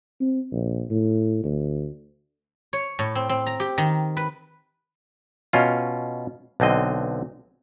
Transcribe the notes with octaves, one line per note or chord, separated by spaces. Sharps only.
C4
A#1
A2
D2
C#5
A2
C4
C4
A#5
G4
D#3
B4
B2 C#4 F4
B1 D3 C4 D#5